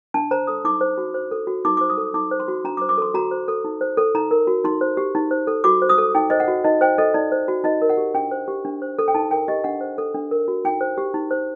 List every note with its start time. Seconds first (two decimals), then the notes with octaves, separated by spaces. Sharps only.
0.14 D4 A5
0.31 C5 A#5
0.47 A4 D#6
0.65 D#4 D6
0.81 C5
0.98 F#4
1.14 C5
1.31 A4
1.47 F#4
1.65 D#4 D6
1.77 C5 D6
1.90 D#6
1.97 A4
2.14 D#4 D6
2.31 C5
2.40 C6
2.48 F#4
2.64 D4 A#5
2.77 D6
2.82 C5
2.89 D6
2.98 A4 C6
3.14 F#4 A#5
3.31 C5
3.48 A4
3.64 D#4
3.81 C5
3.97 A4
4.15 D#4 A#5
4.31 A#4
4.47 F#4
4.64 D#4 C6
4.81 C5
4.97 G4
5.15 D#4
5.31 C5
5.47 A4
5.64 F#4 D6
5.82 C5
5.89 D#6
5.98 A4
6.15 D#4 G5
6.30 C5 D#5
6.40 F#5
6.48 F#4
6.64 D#4 D#5
6.81 C5 G5
6.98 A4 D#5
7.14 D#4 D5
7.32 C5
7.48 F#4
7.64 D#4 D#5
7.82 A#4
7.89 F#5
7.97 G4
8.14 D4 G5
8.31 C5
8.48 G4
8.65 D4
8.82 C5
8.99 A4
9.08 G5
9.14 D#4 A5
9.31 A#4 G5
9.48 G4 D#5
9.64 D4 F#5
9.81 C5
9.98 A4
10.14 D4
10.31 A#4
10.48 F#4
10.65 D#4 G5
10.81 C5
10.98 G4
11.14 D#4
11.31 C5